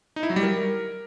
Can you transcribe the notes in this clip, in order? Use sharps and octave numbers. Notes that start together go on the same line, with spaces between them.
D#4
E4
F#3
G3
A#4